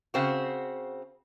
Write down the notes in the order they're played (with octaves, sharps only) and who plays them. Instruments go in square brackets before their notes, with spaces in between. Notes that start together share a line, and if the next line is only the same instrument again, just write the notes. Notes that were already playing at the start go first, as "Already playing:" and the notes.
[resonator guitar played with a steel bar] C#3 C4 F#4